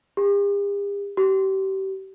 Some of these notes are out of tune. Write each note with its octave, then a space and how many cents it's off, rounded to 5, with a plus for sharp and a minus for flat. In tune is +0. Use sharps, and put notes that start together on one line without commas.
G4 +45
G4 -30